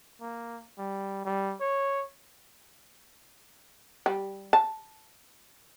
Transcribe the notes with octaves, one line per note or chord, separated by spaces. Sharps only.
A#3
G3
G3
C#5
G3
A5